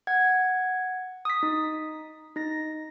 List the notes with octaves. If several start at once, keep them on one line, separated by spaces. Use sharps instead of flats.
F#5 G#6
D#6 B6
D#4
D#4 A#6